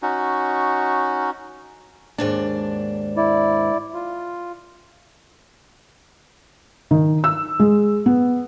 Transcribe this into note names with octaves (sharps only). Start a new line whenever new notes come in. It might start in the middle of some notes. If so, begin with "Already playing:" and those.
C#4 D#4 F#4
D#2 G#2 D4
E4 D5
F4
D#3
E6
G#3
B3